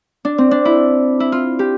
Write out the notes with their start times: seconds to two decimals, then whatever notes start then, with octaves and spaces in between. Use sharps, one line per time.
0.25 D4
0.38 C4
0.51 D4
0.65 E4
1.20 E4
1.32 F4
1.59 G4